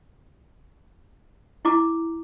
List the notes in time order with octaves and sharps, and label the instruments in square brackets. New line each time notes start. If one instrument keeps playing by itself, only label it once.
[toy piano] E4 A#5 D6